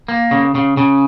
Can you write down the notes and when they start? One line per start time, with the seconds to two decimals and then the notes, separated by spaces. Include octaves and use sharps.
0.08 A#3
0.31 C#3
0.55 C#3
0.77 C#3